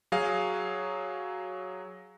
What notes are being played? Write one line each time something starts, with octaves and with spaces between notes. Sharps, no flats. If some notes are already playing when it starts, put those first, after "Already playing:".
F#3 G#4 F5